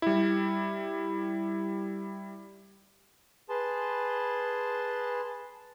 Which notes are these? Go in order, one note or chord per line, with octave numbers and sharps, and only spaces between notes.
G3 E4
G#4 B4 A5 C6